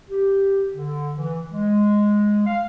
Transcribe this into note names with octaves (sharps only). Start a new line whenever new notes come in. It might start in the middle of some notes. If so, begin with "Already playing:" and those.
G4
D3
E3
G#3
F5